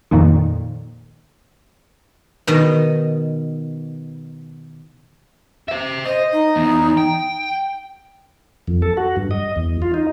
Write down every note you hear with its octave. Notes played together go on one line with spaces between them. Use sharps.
F2 A#2 D#3
B2 D#3 D#5
C5 E5
C5 D#5
D#4
E3 B3
G5
F2
A4
F#4
G2
D#5
E2
F4
D#4